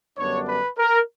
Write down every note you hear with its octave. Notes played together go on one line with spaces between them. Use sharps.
F#2 D3 G3 B3 D4 C#5
B4
A#4